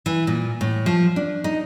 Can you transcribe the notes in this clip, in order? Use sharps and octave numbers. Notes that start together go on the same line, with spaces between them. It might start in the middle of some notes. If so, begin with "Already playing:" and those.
E3
A#2
A2
F3
D4
D#4